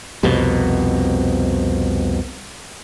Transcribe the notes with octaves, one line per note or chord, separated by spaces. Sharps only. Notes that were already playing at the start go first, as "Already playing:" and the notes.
C2 F2 B2